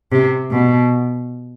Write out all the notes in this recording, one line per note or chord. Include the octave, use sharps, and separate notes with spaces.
C3
B2